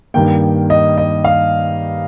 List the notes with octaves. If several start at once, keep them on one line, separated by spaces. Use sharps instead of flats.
G2 D#3 A#3 G5
D#5
D#5
F5